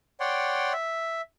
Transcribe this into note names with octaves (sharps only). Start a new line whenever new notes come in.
C#5 D5 F#5 G5 C6
E5